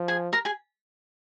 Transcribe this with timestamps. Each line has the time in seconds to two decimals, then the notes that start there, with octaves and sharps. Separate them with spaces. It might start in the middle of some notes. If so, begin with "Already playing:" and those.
Already playing: F3
0.08 G#4 G#5
0.33 A#4 A#5
0.45 G#4 G#5